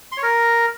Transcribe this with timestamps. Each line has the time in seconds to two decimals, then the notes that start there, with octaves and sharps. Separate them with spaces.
0.12 C6
0.17 C#5
0.23 A#4